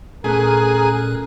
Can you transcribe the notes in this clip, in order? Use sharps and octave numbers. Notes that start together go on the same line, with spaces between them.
A#2 A3 C#4 G#4 A#4 F#6